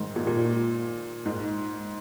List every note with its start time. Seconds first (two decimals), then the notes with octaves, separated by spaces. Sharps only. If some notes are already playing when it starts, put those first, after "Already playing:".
Already playing: G#2 D#3
0.16 A#2
0.27 A#2
1.26 G#2